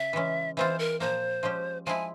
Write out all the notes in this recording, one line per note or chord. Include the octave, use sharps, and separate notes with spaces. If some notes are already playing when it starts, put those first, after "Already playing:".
Already playing: C#3 E5
E3 G#3 C#4
E3 G#3 C4 F4 C5
A#4
A#2 F3 A#3 C5
F3 G#3 C#4 G4
F3 G#3 E4 G#5